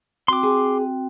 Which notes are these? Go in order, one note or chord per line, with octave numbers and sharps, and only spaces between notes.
C4 F#4 G5 C6 D6
G#4